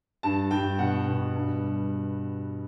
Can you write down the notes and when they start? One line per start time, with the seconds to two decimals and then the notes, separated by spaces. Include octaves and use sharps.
0.23 G2 A5
0.51 G2 G5
0.79 B2 F#5
1.08 B2
1.36 G2
1.64 G3